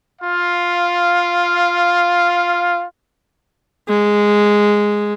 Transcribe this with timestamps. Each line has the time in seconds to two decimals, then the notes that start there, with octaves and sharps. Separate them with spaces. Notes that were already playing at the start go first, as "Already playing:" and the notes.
0.22 F4 F5
3.88 G#3